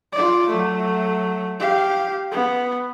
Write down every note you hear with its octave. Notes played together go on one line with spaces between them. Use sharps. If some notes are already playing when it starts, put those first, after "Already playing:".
F4 D5
F#3 A3
G4 F5
B3